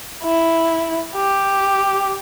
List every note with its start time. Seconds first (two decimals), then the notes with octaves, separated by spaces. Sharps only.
0.23 E4
1.16 G4